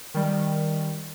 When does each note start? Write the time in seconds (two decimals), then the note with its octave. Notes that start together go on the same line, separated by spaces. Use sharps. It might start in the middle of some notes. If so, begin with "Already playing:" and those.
0.14 D#3 G3